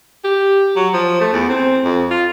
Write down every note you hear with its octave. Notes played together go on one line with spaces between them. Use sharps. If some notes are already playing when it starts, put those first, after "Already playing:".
G4
F#3
F3
A3
E2
C4
F2
F4